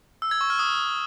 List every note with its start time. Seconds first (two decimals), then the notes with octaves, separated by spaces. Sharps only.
0.22 E6
0.31 G#6
0.41 C#6
0.50 F6
0.59 D#6